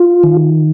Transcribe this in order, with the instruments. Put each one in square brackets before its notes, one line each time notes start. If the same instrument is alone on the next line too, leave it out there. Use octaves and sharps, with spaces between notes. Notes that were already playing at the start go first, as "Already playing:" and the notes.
Already playing: [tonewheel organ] F4
D#3